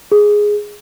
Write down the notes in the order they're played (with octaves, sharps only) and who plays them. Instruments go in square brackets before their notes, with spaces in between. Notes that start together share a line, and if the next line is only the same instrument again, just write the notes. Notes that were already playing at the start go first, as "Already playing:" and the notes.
[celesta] G#4